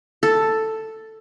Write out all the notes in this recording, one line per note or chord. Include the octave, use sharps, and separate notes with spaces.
A4